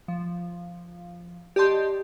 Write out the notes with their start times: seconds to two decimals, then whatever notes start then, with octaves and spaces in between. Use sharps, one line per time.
0.08 F3
1.56 G4 D5 D#5 A5 C6 G6